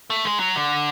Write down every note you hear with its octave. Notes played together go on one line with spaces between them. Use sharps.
A3
G#3
F#3
D3